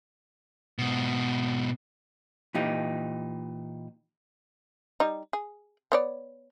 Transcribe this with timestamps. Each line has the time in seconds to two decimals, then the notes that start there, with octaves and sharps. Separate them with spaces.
0.79 G#2 B2
2.55 A#2 E3 D#4 G4
5.00 G3 D#4
5.33 G#4
5.92 B3 C#5 D5